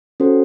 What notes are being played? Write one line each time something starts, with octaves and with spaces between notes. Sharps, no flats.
C#4 F#4 A4 C5